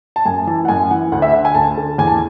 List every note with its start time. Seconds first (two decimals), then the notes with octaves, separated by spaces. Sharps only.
0.16 A5
0.25 F#2 G#5
0.47 E3 A5
0.65 F#5
0.68 F#2 G#5
0.91 E3 F#5
1.12 D2 F#5
1.22 E5
1.33 D3 F#5
1.45 G#5
1.55 D2 A5
1.77 D3
1.98 E2 G#5
2.07 A5